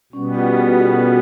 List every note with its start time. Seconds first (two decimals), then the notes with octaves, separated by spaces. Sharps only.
0.13 B2 G3 B3 C#4
0.34 F4 G4
0.57 F#4 G#4
0.78 G4 A4
1.00 F#4 G#4